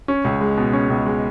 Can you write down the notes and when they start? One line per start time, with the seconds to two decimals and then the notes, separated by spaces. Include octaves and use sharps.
0.08 C#4
0.25 C#2
0.41 G#3
0.57 B2
0.73 C#4
0.90 C#2
1.06 G#3